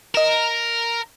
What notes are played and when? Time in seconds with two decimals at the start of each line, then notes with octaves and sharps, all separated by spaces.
0.15 A#4 D#5 E7